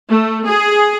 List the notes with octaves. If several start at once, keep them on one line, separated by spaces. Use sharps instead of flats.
A3
G#4